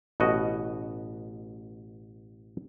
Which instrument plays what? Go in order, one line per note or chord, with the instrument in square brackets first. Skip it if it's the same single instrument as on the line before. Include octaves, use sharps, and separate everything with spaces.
[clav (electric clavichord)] A1 B2 F#4 D#5